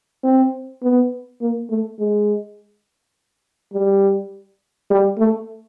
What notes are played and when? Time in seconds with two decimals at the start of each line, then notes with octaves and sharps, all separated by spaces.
0.24 C4
0.83 B3
1.41 A#3
1.70 A3
1.99 G#3
3.73 G3
4.90 G3
5.18 A3